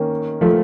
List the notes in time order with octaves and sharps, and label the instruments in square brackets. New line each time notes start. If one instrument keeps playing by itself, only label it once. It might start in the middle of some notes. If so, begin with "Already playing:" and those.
Already playing: [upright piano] D#3 A#3 C#4
[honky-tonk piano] F3 A3